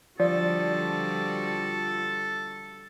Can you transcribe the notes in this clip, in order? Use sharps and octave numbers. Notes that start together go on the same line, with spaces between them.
D3 F3 G3 F#4 A4 D5